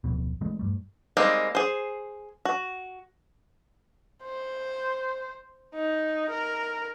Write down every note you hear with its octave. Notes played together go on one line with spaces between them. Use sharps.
D1 B1 F2 B2
E3 G#3 A3 C4
G2 G3 A3
G3 G#3 A#3 C4 D#4
G#4 C5
F#4
C5
D#4
A#4